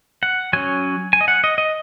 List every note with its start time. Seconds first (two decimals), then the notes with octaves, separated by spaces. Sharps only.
0.23 F#5
0.53 F#3 C#4 G#5
1.13 G#5
1.21 D#5
1.28 F#5
1.44 D#5
1.58 D#5